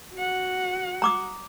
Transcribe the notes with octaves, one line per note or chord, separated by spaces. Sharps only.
F#4 F#5
A#5 D6 D#6